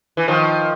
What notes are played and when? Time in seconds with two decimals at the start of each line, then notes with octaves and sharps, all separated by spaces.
0.17 E3
0.28 D#3 F3